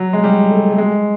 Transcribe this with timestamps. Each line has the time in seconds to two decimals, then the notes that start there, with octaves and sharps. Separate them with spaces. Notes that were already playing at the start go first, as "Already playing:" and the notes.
Already playing: F#3
0.13 G#3
0.24 G3
0.51 A3
0.70 A3
0.78 G#3